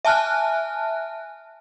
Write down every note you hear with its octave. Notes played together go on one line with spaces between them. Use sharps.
E5 G#5 A5 F6 F#6